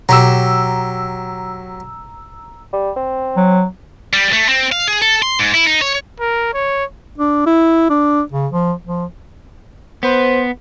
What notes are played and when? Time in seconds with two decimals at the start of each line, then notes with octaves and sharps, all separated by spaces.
0.09 B2 F#3 G4 A#5 E6
2.73 G3
2.96 C4
3.37 F#3
4.13 G3
4.33 A3
4.49 C4
4.72 F5
4.88 G#4
5.02 A4
5.22 C6
5.39 G#2
5.54 E4
5.67 D#4
5.82 C#5
6.20 A#4
6.54 C#5
7.18 D4
7.46 E4
7.90 D4
8.32 C#3
8.53 F3
8.85 F3
10.03 B3 B4 C5